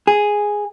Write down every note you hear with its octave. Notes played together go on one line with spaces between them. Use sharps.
G#4